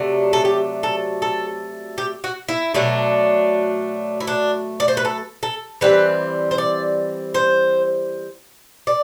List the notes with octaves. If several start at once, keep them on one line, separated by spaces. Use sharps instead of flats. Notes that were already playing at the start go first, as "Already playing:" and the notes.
Already playing: C3 F#3 A3 D4
A4
G4
A4
A4
G4
F#4
E4
B2 F#3 A3 D4
E4
D4
D5
C5
B4
A4
A4
E3 G3 C4 B4
C5
D5
C5
D5